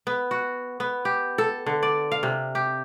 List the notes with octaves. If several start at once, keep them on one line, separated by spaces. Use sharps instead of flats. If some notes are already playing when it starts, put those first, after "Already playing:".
B3
F#4
B3
G4
A4
D3
D5
F5
C3
G4